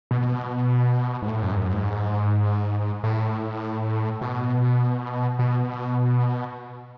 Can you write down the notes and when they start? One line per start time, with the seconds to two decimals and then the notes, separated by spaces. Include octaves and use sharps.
0.11 B2
1.22 G#2
1.28 A2
1.43 F#2
1.52 G#2
1.57 F#2
1.73 G#2
3.04 A2
4.21 B2
5.39 B2